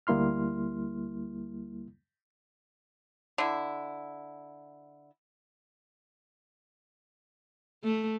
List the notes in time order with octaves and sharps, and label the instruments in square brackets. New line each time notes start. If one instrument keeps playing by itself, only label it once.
[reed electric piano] D2 G3 A#3 E4 C6 F6
[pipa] D3 E4
[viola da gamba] A3